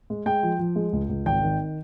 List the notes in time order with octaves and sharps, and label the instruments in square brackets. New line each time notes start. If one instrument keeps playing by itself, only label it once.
[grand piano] G#3
G#3 G5
F3
F3
G#3
C#2
C#2
G#1 G5
D#3